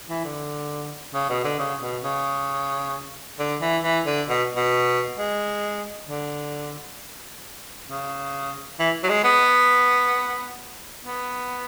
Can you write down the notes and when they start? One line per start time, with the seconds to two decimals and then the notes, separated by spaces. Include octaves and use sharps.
0.10 E3
0.24 D3
1.14 C#3
1.29 B2
1.44 D3
1.59 C#3
1.81 B2
2.04 C#3
3.39 D3
3.61 E3
3.83 E3
4.06 D3
4.29 B2
4.56 B2
5.18 G#3
6.09 D3
7.89 C#3
8.79 E3
9.03 F#3
9.09 G#3
9.23 B3
11.04 B3